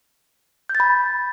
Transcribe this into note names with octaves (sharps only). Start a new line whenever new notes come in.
G6
A6
B5